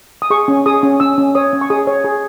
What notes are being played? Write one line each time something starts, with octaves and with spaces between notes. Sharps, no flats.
D#6
G#4 C#6
C#4
G#4 D#6
C#4
C#4 E6
C#4
C#5 D#6
C#4
C#6
G#4 D#6
C#5
G#4